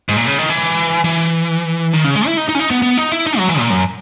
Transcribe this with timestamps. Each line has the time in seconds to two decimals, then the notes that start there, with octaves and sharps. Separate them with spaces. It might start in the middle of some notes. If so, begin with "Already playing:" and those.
0.09 G#2
0.17 A#2
0.27 C#3
0.38 D#3
0.50 E3
1.04 E3
1.93 D#3
2.04 C#3
2.16 G#3
2.27 E4
2.37 D#4
2.49 D#4
2.55 C#4
2.59 D#4
2.71 B3
2.82 B3
2.97 D#4
3.12 E4
3.27 D#4
3.38 F#3
3.49 E3
3.59 A#2
3.70 F#2